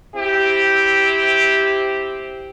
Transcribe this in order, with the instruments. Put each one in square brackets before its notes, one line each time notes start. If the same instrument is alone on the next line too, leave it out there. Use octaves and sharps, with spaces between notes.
[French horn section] C4 E4 G4